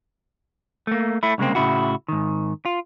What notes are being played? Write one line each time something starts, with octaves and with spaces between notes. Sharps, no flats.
A3 A#3
A3 E4
C2 C#3 G#3 A#3 C4
A2 C#3 E4 F#4
G#2 D#3
F4